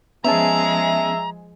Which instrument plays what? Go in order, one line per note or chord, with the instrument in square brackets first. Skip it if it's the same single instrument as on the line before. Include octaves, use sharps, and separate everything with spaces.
[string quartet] F3 G#3 G#4 [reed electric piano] B3 C#4 A5 [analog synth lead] E5 [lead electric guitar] A#5